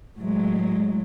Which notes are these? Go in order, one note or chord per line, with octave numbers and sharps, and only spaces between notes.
A2 E3 F#3 G#3